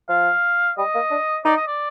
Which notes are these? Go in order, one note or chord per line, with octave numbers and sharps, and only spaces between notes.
F3 F5
G3 D#5
A#3
D4
D#4 D5
D#5
D5